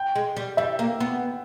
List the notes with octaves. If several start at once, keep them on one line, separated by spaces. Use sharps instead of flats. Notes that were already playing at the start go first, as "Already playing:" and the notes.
Already playing: G5
G#3
G3
G3 E5
A#3
B3